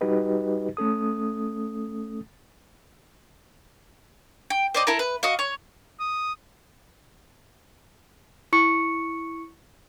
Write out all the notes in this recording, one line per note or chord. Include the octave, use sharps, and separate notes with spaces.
G3 D#4 F#4 G4 B4 D#5
A3 C#4 A4 D#6
G5
C5 D5 D#5
E4 A4 A#4
B4
F#4 D#5 F5
C#5
D#6
E4 C#6 C#7